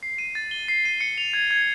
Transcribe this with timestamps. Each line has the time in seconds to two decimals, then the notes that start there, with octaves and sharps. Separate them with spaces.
0.03 C7
0.18 D#7
0.35 A6
0.51 G7
0.68 C7
0.85 D#7
1.01 C#7
1.18 F7
1.33 G#6
1.51 G#6